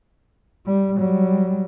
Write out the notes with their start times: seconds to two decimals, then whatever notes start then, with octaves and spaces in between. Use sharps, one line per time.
0.66 G3
0.97 F#3 G3